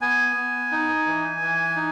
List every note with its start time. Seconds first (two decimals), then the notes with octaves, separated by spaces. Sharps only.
0.01 B3 G#5
0.36 B3
0.72 D#4
1.06 E3
1.41 E3
1.76 D#4